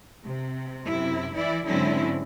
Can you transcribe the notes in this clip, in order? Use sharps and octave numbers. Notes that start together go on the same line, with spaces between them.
C3
F#2 C3 E4
E3 E4 D5
G#2 D3 F#3 C4 C#4 E4